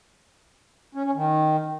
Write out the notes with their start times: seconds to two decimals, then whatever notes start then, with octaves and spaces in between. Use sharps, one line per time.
0.95 C#4
1.05 C#4
1.15 D#3